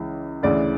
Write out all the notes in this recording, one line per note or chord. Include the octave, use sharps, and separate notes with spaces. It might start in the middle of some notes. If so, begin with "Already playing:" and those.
Already playing: C#2 C#3 E3
D2 C#3 E3 D5